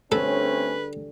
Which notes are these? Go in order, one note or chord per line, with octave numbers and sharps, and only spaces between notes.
D3 G3 A3 C4 C#4 G#4 A4 B4